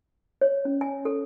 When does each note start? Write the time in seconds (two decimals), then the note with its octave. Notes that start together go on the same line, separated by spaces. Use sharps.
0.41 C#5
0.65 C#4
0.81 G#5
1.05 A4